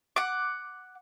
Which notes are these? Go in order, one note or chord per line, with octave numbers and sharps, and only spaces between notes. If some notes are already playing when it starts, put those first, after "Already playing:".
F#5 D6